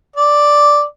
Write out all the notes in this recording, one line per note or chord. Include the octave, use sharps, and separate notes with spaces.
D5